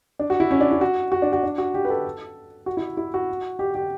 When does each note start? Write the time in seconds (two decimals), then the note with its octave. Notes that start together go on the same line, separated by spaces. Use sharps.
0.19 D4
0.30 F#4
0.40 E4
0.51 C#4
0.61 D4
0.71 E4
0.81 F#4
1.12 F#4
1.22 D4
1.33 F#4
1.43 D4
1.58 F#4
1.74 G4
1.85 B4
1.90 A4
2.66 F#4
2.77 E4
2.97 E4
3.14 F#4
3.59 G4
3.75 G4